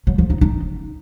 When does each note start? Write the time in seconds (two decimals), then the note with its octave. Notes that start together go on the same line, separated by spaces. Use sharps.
0.07 F#3
0.18 F3
0.30 D#4
0.41 D#4